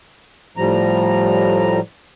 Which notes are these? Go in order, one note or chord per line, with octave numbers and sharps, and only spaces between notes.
A2 F3 G3 A#5